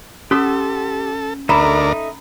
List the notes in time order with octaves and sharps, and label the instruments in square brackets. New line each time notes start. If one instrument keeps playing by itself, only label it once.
[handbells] C#4 [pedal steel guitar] G4 C6 E6 [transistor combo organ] A4
[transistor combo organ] D2 A#4 D5 [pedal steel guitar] D#4 A4 E5 [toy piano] A#5 B5